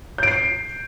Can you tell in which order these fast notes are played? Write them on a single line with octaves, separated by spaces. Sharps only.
G6 D7 C7